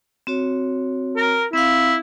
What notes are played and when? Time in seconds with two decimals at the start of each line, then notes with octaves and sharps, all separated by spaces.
0.27 C4 F#4 C#5
1.16 A#4
1.53 C4 E4 F5